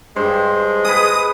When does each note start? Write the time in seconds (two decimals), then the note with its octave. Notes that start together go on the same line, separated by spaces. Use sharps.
0.16 G2 G#3 C5
0.84 G#4 B4 D#6